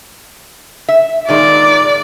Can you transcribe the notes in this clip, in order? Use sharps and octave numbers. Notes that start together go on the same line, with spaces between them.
E5
A#2 D#3 G#3 D5